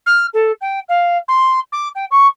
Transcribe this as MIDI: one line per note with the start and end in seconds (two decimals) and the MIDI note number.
0.06 0.26 89
0.33 0.52 69
0.61 0.79 79
0.89 1.17 77
1.28 1.59 84
1.72 1.88 86
1.95 2.05 79
2.11 2.27 85